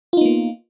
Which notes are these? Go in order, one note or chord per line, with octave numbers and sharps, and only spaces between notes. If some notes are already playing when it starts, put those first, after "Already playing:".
A#3 B3 D#4 F4